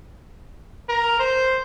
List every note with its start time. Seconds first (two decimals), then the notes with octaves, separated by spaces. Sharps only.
0.89 A#4
1.19 C5